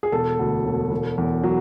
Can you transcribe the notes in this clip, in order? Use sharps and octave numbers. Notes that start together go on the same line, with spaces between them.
G#4
E1 A4
D2
E1
E1
E2
F#3